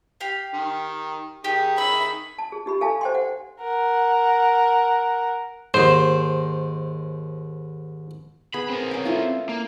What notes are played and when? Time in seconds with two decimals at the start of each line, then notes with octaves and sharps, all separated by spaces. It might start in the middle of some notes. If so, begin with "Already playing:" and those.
0.21 G4 F5
0.54 D#3
1.44 D#3 G4 G#4
1.78 E5 B5
2.38 A5
2.52 G#4
2.66 D#4 G4 B5
2.81 A4 F5 G#5 A5
3.01 C5 G5 C6
3.14 F#5
3.61 A#4 F#5
5.74 D#2 G#2 C5
8.54 B3 G#4 B5
8.69 C4 A#4
8.91 C#4 G5
9.05 A3 E4 F4
9.49 A#3